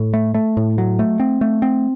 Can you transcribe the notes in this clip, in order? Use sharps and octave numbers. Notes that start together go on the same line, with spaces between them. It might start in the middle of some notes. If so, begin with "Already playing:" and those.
Already playing: A2
A3
A3
A2
F#3
A3
C4
A3
C4